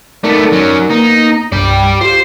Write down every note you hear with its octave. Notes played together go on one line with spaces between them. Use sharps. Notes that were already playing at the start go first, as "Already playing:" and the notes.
A3 B3 D#4 A#4 D5
F#3 C#4
A#3 B3 D#4
C2 G2 D5 G5
F4 G4 C5